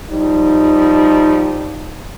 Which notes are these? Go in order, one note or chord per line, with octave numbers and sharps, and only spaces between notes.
F3 G3 D#4